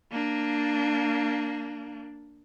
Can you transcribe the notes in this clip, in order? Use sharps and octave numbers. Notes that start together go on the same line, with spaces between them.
A#3 D4